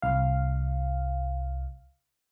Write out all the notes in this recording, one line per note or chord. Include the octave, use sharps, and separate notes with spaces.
C2 F5